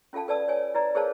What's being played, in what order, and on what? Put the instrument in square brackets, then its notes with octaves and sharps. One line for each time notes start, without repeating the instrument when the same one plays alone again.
[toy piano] C#4 F4 A4 F5 A5
A4 B4 D5 A5 E6
C#5 G#5
E4 B4 D5 A#5
G#4 A#4 C5 C#5 F5 A5